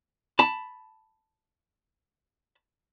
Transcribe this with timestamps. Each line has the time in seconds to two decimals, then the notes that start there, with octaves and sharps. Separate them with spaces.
0.39 A5 B5